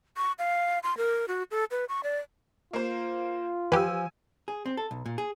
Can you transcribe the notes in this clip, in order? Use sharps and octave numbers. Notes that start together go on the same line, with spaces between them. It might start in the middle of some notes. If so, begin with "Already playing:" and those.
C#6
F5
C6
A#4
F#4
A4
B4
C#6
D5
A#3 F4 C5
F3 G4 B4 G#5 E6
G#4
C4
A4
B1
A#2
G#4